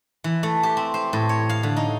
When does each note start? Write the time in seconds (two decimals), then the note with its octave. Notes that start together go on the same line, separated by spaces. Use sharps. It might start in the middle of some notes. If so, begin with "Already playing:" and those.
0.24 E3
0.43 A3
0.63 G4
0.77 C4
0.94 C5
1.13 A2
1.29 C#5
1.49 F5
1.63 D3
1.77 D#4